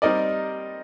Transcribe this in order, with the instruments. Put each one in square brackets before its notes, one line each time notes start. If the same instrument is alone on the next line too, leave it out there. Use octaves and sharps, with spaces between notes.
[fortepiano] G3 C4 D#4 A#4 D5 [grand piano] D#5